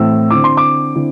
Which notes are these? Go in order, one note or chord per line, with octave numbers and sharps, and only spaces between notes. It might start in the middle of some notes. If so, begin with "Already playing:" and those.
Already playing: A2 E3 A3 C4 E4 E6
D3 C4 E4 D6
C6
D6
D3 C4 E4